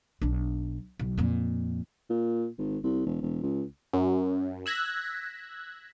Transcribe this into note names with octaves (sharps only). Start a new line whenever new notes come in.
B1 D4
B1
F2 A#2
A#2
G#1
C2
E1
E1
C#2
F#2
E6 F#6 G#6 A#6 B6